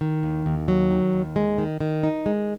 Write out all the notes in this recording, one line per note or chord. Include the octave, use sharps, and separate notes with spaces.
D#3
D#2
D#2
F#3
D#3
D#2
G#3
D#3
D#3
D#4
G#3